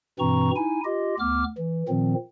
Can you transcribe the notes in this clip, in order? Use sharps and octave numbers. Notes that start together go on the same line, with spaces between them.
G2 B2 E3 C4 A#5 C#6
D#4 E4 G#5
F4 G4 D#5
D2 B3 D6 F6
E3
A#2 D#3 F3 C4